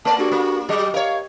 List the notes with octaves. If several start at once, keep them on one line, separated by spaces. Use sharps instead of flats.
A3 D5 A5
D4 F#4 G4 A4
A#3
F#3 G4 G#4 D#5
A#4 C#5 F5